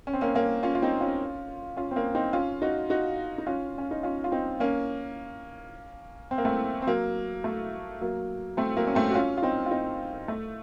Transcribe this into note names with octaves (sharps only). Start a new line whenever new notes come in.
C#4
C4
A#3 C#4
A#3 C#4
C#4 F4
F4
C4 D#4
C#4 F4
C#4 F4
C4
A#3 C#4
C4 D#4
C#4 F4
D#4 F#4
D#4 F#4
D#4
C#4 F4
C#4
D#4
C#4 F4
F4
C4 D#4
A#3 C#4
C4
A#3
A3 C4
C4
F#3 A#3
A3
F#3 A#3
A3 C4
F#3 A#3
C#4
A3 C4
F#4
C#4 F4
F4
C4 D#4
F4
C4 D#4
A3